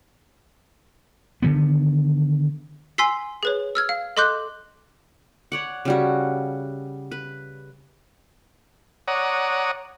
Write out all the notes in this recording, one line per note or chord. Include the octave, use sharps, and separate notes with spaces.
D3 D#3 B3
G#5 C6 E6 B6 C7
G#4 B4 C#5
E6 F6 G#6
F5
A4 D#5 C6 D6 F#6 G6
C#5 D5 F#5
C#3 G3 F#4
B4
C#5 D5 F#5 A#5 D#6